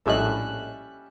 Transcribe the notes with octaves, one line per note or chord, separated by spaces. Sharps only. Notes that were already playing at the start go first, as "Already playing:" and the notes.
A#1 A2 G3 C#4 A4 D#5 E5 F#6